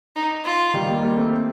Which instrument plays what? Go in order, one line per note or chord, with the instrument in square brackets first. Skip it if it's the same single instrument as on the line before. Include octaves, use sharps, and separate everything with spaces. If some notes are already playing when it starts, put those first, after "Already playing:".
[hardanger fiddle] D#4
F4
[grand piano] D#3 G3
G3 A#3
G3 A#3
A3 C4